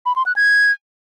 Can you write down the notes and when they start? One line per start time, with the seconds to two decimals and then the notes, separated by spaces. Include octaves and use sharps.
0.06 B5
0.16 C6
0.26 F#6
0.36 G#6